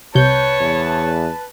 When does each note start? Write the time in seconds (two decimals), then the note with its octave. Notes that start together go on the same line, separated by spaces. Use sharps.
0.15 C2 C3 B4 C#5 A5 G6
0.60 E2